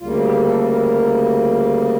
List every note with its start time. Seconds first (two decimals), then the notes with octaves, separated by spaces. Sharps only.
0.01 D2 C#3 G3 A#3 F4
0.25 G4
0.48 A4
0.72 A#4